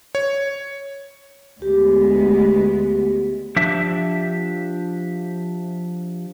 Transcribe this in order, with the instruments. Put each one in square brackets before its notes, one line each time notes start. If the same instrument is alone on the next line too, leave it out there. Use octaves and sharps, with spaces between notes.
[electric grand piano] C#5
[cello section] D2 G#3 B3 [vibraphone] G4
[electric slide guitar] F3 D4 G4 E5